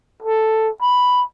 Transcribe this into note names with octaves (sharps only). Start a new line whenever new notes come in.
A4
B5